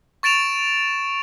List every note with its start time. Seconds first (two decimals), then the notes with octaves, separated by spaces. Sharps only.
0.23 C#6 A6 D7 E7 F7